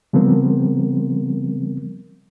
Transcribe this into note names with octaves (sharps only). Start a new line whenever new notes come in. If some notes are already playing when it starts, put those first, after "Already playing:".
C#3 F3 G3 B3 C4 A#4